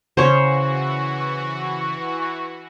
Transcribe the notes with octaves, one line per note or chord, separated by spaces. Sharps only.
C#3 E3 F#4 C5 C#5 C#6